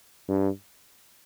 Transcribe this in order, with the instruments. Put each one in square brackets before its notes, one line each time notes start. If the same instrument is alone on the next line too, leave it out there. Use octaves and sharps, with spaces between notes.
[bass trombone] G2